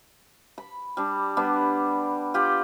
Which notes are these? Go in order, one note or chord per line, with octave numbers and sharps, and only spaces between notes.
B5
G3 D4
G3 B3 D4
F4 G4 F#5 G5